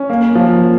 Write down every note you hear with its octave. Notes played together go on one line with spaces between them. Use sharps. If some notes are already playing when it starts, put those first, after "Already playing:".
Already playing: C#4
A#3
F3